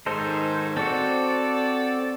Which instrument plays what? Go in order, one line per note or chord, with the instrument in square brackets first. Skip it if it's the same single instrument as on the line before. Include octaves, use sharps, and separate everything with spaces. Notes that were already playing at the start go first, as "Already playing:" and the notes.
[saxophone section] G#2 D#3 [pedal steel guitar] D#4 A4 C5
[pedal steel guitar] C4 F#4 [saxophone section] A4 D5